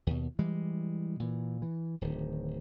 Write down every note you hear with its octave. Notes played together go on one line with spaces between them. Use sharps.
D#2 B2
E3 G3 G#3
A#2 E3
E3
D1 D#3